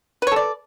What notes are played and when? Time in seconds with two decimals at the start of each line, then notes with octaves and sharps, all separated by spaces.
0.22 B4
0.27 C#5
0.32 A4
0.36 D5